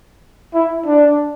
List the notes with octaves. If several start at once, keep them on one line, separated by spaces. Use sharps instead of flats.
E4
D4